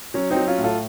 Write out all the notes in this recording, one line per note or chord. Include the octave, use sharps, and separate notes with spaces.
F#3 C#4
C4 D#4
F#3
C#4 F4
A2
F4 A4